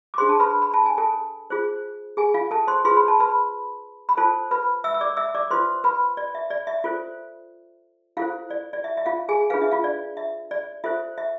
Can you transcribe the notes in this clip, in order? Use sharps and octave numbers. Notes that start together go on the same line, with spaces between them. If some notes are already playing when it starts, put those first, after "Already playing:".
D6
D4 G#4 C5 C6
A5
B4 B5
B5
A5
G#5
A4 A5
F4 G#4 C5
G#4 G#5
F4 F5
A4 A5
C5 C6
F4 G#4 B4 C6
B5
A5
B4 B5
B5
F4 A4 C5 A5
B4 B5
E5 E6
E6
D5 D6
E5 E6
D5 D6
F4 B4 C5 C6
B4 B5
D5
E5
D5
E5
F4 A4 C5
E4 F4 A4 C5 F5
D5
D5
E5
E5
F4 F5
G#4 G#5
D4 F4 G#4 B4 F5
E5
F4 F5
D5
E5
D5
F4 A4 C5 E5
E5